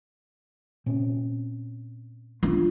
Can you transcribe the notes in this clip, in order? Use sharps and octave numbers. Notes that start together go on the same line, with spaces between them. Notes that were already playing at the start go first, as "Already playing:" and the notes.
A#2 C4 C#4
D4 F4